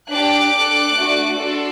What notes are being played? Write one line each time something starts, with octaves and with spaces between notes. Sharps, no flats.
D4 G4 D6 F#6
D4 A4
A3 D4 F#4
D4 F#4 A4 C6 E6